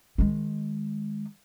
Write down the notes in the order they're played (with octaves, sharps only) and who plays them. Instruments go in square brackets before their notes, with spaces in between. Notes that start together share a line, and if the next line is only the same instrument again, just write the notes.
[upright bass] D#3 G#3